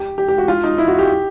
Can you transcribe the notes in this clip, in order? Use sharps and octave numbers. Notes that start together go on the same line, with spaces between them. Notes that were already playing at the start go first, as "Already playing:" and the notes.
Already playing: G4
G4
G4
F#4
F4
D#4
E4
F#4
G4